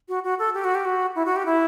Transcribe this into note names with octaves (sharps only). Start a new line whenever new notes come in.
F#4
F#4
A4
G4
F#4
G4
F#4
E4
F#4
G4
E4